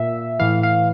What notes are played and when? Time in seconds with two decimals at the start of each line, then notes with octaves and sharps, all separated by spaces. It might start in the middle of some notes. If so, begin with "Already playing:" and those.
Already playing: A#2 E5
0.39 A2 E3 F5
0.63 F5